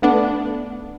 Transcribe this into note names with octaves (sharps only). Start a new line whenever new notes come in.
A3 B3 D4